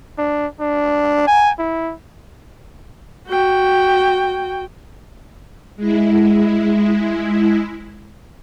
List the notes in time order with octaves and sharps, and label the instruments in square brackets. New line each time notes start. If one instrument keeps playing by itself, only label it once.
[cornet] D4
D4
G#5
E4
[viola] F#4 G5
[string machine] G#3 E4